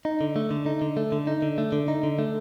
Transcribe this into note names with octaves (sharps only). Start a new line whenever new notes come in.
D#4
D3
A3
D3
D#4
D3
A3
D3
D#4
D3
A3
D3
D#4
D3
A3